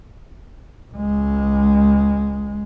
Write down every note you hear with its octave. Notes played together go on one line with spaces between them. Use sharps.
C#2 G#3